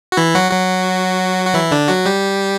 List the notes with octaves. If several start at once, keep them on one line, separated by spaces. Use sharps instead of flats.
F#4
E3 E4
F#3 F#4
F#3 F#4
F#4
E3 E4
D3 D4
F#3 F#4
G3 G4